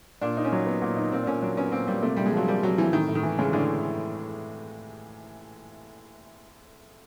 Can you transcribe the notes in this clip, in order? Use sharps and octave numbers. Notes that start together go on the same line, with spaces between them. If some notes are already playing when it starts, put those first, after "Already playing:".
A#2 D4
D#4
C#4
F#3
B3
A#2
D#4
A#2 C4
D4
A#2 C#4
F#3 D4
B3 C#4
A#2 C4
A#2 G3
C3 A3
C3 G3
G#3
F3 F#3
G3 A#3
C3 F#3
C3 E3
A2 D#3
A2
D#3
E3
C#3 G#3
A2 D3